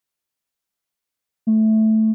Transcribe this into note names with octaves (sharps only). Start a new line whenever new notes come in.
A3